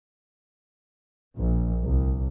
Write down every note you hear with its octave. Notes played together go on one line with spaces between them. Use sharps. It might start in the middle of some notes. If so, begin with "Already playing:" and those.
A#1
C2